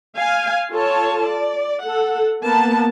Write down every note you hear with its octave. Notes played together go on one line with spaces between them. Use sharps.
F5 G#5
F4 A4 C#5 A5
D5
A4 F#5
A#3 B3 A5